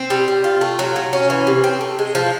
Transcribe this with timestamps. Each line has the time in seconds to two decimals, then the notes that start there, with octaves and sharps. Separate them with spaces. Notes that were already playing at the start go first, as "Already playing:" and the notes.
Already playing: C4
0.10 G3
0.28 G3
0.44 F4
0.61 A3
0.79 F#3
0.96 F#3
1.13 C#4
1.30 E3
1.47 C3
1.64 C4
1.81 A3
1.99 G#3
2.15 F3